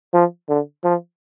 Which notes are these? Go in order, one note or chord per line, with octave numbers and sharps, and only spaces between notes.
F3
D3
F3